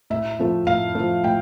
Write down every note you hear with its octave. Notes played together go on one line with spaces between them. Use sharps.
A2 E5
F3 A3
A2 F5
F3 A3
A2 G5